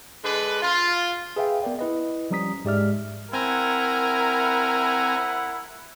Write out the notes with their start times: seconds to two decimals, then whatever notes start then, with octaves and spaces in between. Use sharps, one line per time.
0.24 D3 G#3 B4
0.62 F4
1.36 G#4 B4 E5 F5 G5
1.62 B3 A#4 D5 G5
1.79 E4 B4 D#5
2.30 F3 G3 C#4 A#5 D#6 B6
2.65 G#2 G#3 G4 D5 E5 F6
3.33 C4 E4 A#4 F#5 G#5 A#5